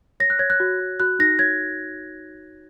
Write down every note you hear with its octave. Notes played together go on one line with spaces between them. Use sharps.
C#5 A#6
F#6
C#5 G#6
F#6
F#4
F#4
F#4 F#6
D#4 A#6
C#5 G#6